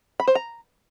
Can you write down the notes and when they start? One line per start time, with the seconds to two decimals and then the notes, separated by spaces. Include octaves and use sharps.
0.20 B5
0.27 C5
0.35 A#5